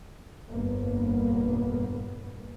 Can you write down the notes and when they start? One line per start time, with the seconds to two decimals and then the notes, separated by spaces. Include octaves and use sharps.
0.50 G1 F2 A#2 A#3 B3